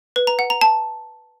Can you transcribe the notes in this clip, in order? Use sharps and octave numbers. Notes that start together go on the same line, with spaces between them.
B4
A#5
F#5
A#5
A5